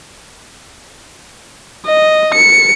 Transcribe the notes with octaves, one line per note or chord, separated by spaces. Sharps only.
D#5
C#7